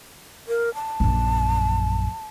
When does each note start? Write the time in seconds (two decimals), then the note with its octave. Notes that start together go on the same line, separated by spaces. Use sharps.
0.48 A#4
0.75 A5
1.00 A#1 F#2